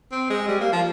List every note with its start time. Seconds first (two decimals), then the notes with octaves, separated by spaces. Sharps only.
0.12 C4
0.30 G#3
0.48 G3
0.61 A#3
0.72 F3